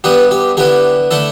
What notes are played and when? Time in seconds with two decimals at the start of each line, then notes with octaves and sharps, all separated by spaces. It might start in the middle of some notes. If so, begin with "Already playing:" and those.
0.04 G2 G3 B3 G4 B4
0.31 G4
0.57 D3 B3 E4 G4
1.11 D3 A3 E4 A4